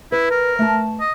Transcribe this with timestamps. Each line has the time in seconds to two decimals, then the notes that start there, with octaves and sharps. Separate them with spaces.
0.12 E4 B4
0.31 A#4
0.59 A3 A5
1.00 D#5